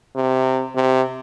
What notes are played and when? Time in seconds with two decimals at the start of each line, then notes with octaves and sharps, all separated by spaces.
0.16 C3
0.75 C3